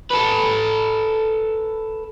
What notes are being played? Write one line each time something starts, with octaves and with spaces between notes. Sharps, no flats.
A4 B4